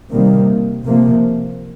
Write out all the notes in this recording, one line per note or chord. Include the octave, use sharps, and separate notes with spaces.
C3 D#3 G3 A#3
C3 F3 A#3